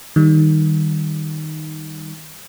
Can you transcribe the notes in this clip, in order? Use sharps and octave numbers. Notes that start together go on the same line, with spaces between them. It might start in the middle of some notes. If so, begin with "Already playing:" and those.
D#3 G3